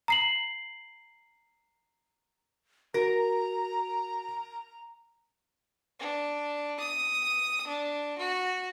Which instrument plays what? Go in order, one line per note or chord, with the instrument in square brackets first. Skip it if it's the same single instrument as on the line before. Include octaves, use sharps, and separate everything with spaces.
[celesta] A#5 C7 F#7
[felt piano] F#4 [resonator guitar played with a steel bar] A#4 [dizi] A#5
[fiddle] D4
D#6
D4
F#4